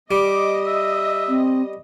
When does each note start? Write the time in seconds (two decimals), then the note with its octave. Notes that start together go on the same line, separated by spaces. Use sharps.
0.11 G3 D#5 D6
0.67 E5
1.29 C4